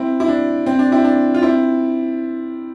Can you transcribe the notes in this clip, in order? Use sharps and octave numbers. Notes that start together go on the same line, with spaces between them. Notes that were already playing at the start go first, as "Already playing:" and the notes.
Already playing: C4 E4
E4
D4
C4
D4
C4 E4
D4
F4
C4 E4